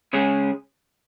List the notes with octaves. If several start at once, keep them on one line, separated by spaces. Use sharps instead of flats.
C#3 G#3 C#4 G#4